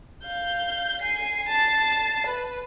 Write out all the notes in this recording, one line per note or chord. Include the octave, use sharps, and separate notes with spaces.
F5 G6
G#5 C7
A5 C7
B4